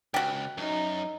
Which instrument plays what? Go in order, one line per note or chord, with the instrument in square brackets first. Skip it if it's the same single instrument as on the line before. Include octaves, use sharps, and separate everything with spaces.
[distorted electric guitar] C#2 [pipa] F#4 G4
[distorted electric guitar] F#2 [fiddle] D#4